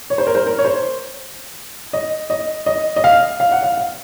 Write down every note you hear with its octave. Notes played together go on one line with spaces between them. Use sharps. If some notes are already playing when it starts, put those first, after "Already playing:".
C#5
C5
A#4
C5
A#4
C#5
C5
D#5
D#5
D#5
D#5
F5
F5
F#5
F5
F5